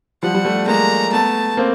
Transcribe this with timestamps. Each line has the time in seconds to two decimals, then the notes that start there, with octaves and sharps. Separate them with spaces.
0.23 F3 G3 F#5
0.34 F3 G3
0.45 G3 A3
0.67 G#3 A#3 A#5
1.13 A3 B3 A5
1.57 A#3 C4